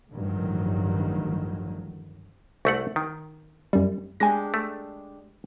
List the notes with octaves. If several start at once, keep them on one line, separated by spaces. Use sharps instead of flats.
A1 D2 G2 D#3 F3 F#3
C2 A3 F#5 C#6
D#3
F#2 G3
G#3 D4 G4 G#5 A#6
A3